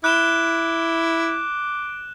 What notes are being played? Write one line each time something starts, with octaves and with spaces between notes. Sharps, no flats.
E4 D6 F#6 E7 G7